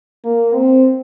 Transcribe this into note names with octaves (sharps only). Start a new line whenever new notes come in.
A#3
C4